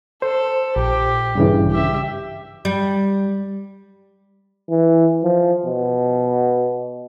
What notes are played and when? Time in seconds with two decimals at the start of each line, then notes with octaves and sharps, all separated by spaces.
0.22 A4 C5
0.76 A#1 G4
1.35 G2 C#3 E3
1.71 G4 E5
2.65 G3
4.70 E3
5.23 F3
5.66 B2